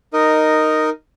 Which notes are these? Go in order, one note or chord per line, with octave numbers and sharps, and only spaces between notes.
D#4 A#4 D#5